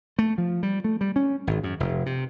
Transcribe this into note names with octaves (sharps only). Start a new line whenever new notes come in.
A3
F3
G3
A3
G3
C#4
G#1
F#2
F1
C3